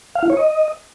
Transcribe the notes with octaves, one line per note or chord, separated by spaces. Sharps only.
F5
E4
C#5
D#5